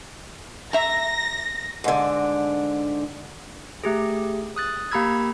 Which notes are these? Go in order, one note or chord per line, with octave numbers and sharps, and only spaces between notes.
E5 A#5 A#6
G#2 D3
A3 G4 G#4
D#6 F#6 A6
A#3 G4 A#5 B5 E6 G#6